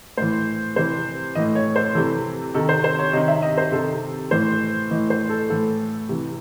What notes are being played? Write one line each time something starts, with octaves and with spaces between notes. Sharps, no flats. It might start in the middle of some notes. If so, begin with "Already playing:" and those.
A2 E3 C5
C3 E3 C5
A2 E3 D#5
C#5
C5
C3 E3 A4
C3 D#3 A4
C5
C5
C#5
C3 D#3 D#5
E5
D#5
C5
C3 D#3 A4
A2 E3 C5
A2 E3 D#5
C5
A4
A2 E3 A4
C3 E3